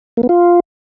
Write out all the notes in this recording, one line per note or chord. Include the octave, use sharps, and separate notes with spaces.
A#3
B3
F4